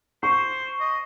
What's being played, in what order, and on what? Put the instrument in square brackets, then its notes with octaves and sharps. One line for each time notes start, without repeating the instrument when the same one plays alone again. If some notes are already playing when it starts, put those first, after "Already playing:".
[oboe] C5 [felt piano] C#6
[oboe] D#5